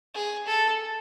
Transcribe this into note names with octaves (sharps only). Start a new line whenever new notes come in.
G#4
A4